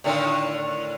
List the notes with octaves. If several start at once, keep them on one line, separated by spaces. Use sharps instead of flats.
A2 D3 D#3